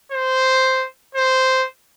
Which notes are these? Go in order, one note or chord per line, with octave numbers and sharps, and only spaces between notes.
C5
C5